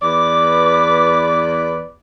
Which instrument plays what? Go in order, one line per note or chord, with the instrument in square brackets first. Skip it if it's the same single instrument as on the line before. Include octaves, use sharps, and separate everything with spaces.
[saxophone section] E2 B4 D5 [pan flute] D6